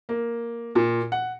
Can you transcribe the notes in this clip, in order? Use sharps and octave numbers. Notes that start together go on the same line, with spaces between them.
A#3
A#2
F#5